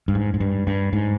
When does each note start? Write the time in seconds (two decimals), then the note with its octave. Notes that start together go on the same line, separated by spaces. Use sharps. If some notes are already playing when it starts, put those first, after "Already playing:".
0.08 G2
0.15 G#2
0.34 G#2
0.40 G2
0.67 G2
0.93 G#2